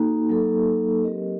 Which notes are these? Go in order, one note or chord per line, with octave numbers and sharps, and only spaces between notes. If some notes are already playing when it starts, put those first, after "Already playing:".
Already playing: A#3 D#4 F#4 A4
F#3 A#3 D#4 A4
F#3 C4 G4 A#4 D#5